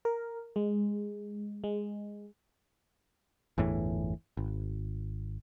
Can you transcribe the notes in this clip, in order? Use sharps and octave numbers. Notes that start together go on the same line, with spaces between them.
A#4
G#3
G#3
G1 E2 A2 E3
G#1